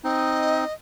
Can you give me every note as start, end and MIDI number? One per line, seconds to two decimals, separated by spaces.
0.04 0.65 60
0.04 0.65 63
0.04 0.73 75